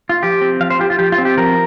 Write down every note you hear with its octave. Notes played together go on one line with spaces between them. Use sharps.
F4
F3 G4
C4
F3 F5
C5
F4 G4
F4
F3 G4
F4
C4
G4
F3 A#4